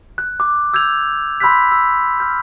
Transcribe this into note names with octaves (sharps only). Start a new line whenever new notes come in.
F#6
D6
E6 G6 G#6 F7
B5 C6 E6 F#6 G6 B6
E6
F6 G6